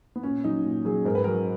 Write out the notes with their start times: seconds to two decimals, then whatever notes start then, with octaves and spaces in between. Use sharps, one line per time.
0.16 B3
0.23 A#2 C#4
0.44 F#3 D#4
0.65 A#2
0.85 F#3 G#4
1.05 G#2 A#4
1.15 B4
1.24 F#3 A#4